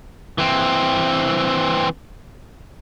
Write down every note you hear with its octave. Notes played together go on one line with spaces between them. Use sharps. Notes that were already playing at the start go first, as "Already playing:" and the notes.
E3 C4